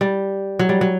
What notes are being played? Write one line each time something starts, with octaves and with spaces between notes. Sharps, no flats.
G3
F#3
G3
F#3